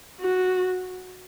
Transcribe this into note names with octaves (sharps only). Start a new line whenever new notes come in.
F#4